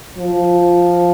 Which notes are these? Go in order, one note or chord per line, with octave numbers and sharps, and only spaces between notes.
F3